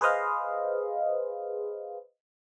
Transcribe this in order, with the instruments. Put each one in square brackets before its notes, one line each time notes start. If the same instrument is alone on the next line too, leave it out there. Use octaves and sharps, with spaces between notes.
[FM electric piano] G#4 B4 C5 D#5 F5